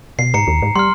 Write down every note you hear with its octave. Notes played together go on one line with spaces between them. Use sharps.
B2 C7
G#2 A#5 C#7
D#2
G#2
G3 C6 F6